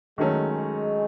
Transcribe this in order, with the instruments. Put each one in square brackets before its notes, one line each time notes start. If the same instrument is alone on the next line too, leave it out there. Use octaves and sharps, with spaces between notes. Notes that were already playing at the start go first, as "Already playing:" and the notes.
[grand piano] D#3 F#3 A3 C#4 [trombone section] G#3